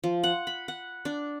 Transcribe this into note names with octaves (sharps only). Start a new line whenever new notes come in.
F3
F#5
B5
F#5
D4